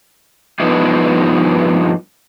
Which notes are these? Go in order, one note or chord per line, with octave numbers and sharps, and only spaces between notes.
G2 F3 B3 D#4 E4